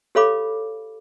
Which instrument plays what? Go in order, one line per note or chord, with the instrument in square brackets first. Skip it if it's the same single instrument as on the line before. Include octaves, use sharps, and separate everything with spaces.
[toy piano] G4 A4 C#5 F5 B5 D6